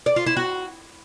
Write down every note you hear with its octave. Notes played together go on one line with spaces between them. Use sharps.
D5
F4
E4
F#4